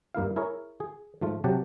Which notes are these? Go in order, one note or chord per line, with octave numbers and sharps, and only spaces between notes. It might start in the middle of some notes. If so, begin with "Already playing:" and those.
G2 A#3 E4 F5
E4 G#4 A#4 C#5
G#4
G#2 F3 A3 F4
C3 F#3 G4 F#5 G5 A5